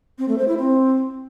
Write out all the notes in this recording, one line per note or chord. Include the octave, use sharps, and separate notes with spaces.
C4
A3
C5
E4
C4